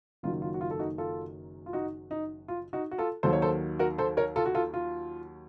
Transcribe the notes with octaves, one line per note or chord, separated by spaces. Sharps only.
F#1 F#2 D#3 F#3 F4
F4
F#4
F4
A4
D#4 F#4
F4 A4
F4
D#4 F#4
D#4
F4
D#4 F#4
F#4
F4 A4
D#2 D#3 F#3 A4 C5
C#5
A4 C5
F#4 A#4
A4 C5
A#4 C#5
F4 A4
F#4
F4 A4
F4